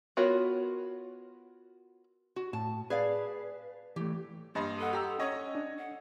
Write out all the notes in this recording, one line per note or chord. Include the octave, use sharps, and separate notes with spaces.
B3 F4 F#4 A#4 C#5
F#4
A2 A5
G#4 B4 D5 F5
E3 A3 G4
G2 A#3 D#5 C6
A4 F#5 D#6
G4 A#5 E6
C#4 C#5 D#5
D4
F#5